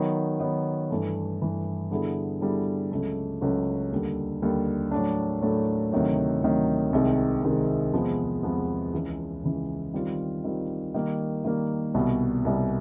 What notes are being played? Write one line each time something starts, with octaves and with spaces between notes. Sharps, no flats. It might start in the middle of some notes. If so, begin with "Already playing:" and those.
Already playing: D#3 F#3 B3
D#3 F#3 B3
G2 E3 A3
G2 E3 A3
D3 G3 B3 E4 G#4
D3 G3 B3 E4 G#4
C#2 C#3 F#3 A3
C#2 C#3 F#3 A3
D#2 D3 G3
D#2 D3 G3
A2 F#3 A3 D4
A2 F#3 A3 D4
D2 C3 D#3 F#3
D2 C3 D#3 F#3
C2 C3 D#3 G#3 C4
C2 C3 D#3 G#3 C4
E2 C3 F3 G#3 B3
E2 C3 F3 G#3 B3
C#2 C#3 E3
C#2 C#3 E3
D#3 G3 C4 F4
D#3 G3 C4 F4
D#3 G3 A#3
D#3 G3 A#3
C2 B2 G3
C2 B2 G3